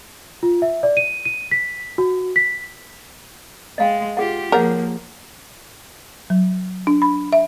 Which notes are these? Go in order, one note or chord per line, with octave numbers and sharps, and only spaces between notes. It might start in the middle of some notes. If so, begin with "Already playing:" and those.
F4
E5
D5
D#7
D#7
B6
F#4
B6
G#3 D#5 F5 G5
F4 G4 G#4 F#5
F3 A#3 G#4 A#4 C#5 F#5
F#3
D4
B5
E5